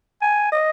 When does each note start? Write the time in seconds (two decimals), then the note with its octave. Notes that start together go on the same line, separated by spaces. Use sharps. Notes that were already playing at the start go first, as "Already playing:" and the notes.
0.22 G#5
0.52 D#5